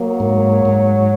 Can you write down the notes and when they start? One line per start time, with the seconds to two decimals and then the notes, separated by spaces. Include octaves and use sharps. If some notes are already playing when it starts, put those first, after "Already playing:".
Already playing: F#3 A#3
0.20 G#2
0.65 G#2